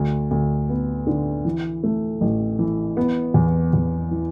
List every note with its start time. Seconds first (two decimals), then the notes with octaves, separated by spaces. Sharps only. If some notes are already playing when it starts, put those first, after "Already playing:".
Already playing: D2
0.31 D2
0.69 B3
1.07 D3
1.45 E3
1.83 A3
2.21 A1
2.59 E3
2.97 B3
3.34 E2
3.73 E2
4.11 E3